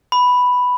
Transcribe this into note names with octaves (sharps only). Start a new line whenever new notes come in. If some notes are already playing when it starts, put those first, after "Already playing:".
B5